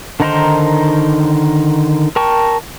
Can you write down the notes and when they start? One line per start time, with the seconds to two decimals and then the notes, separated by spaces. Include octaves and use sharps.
0.20 D3 D#3 D#4 A#4 C5
2.16 A#4 G5 A5 C#6